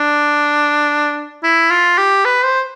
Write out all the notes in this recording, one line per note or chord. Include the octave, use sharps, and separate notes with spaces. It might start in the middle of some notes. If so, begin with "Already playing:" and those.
Already playing: D4
E4
F4
G4
B4
C5